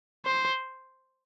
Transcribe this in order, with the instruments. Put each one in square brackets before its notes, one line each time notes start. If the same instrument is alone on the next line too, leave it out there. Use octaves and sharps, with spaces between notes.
[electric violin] C5